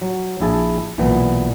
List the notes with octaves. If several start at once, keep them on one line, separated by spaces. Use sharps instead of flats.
F#3
A#1 E4 G#4 A5
B1 A#2 E3 B3